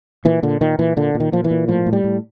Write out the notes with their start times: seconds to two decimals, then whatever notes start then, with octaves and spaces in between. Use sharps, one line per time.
0.25 A#2 E3
0.43 A#2 D3
0.61 A#2 D#3
0.79 A#2 E3
0.97 A#2 D3
1.15 A#2
1.20 D#3
1.32 A#2 F3
1.44 E3
1.51 A#2
1.68 A2 F3
1.86 A2
1.93 G3
2.04 A2